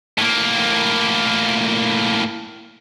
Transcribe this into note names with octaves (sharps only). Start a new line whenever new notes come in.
A2 A#3